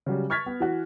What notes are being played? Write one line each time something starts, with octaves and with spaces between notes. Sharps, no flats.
C#3 F#3 G3
C#6 F6 G#6 A6 B6
B3
E3 F#4